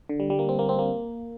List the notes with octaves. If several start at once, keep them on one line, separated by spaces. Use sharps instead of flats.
D3
G3
G3
A#3
C4
A#3
C4
A#3